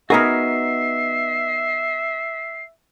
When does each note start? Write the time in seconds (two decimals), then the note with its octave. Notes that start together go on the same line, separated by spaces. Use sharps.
0.10 B3 D#4 F#4 G#4 A#4 E5 C7